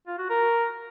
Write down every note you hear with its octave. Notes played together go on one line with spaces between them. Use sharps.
F4
F#4
A#4